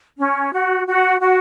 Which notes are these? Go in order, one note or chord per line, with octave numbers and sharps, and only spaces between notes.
C#4
F#4
F#4
F#4